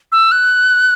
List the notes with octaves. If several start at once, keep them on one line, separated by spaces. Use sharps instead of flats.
E6
F#6